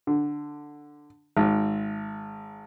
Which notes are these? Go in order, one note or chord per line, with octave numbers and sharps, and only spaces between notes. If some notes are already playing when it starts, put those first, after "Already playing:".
D3
G#1